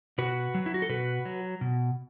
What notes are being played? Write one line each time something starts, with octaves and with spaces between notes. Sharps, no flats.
B2 F#4 B4
F#3
E4
F#4
A4
B2 F#4 B4
F#3
B2